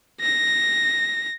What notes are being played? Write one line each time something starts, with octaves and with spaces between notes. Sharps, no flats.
A#6